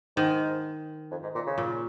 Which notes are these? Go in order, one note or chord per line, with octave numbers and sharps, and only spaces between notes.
G#2 D#3
F2
G#2
A#2
C#3
A#2